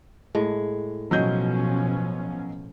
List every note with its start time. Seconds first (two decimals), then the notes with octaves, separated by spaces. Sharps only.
0.35 A2 G#3
1.11 B2 F3 F#3 C#4 D#5 G6